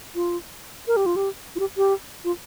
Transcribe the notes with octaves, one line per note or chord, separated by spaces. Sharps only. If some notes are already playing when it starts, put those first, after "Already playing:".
F4
A#4
G4
F4
G4
F4
G4
G4
F4